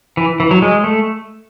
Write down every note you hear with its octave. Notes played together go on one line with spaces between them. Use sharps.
E3
E3
F#3
G#3
A3